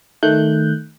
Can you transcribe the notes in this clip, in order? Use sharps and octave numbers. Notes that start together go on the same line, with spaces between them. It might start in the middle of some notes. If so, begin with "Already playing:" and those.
D#3 A3 F#6 G6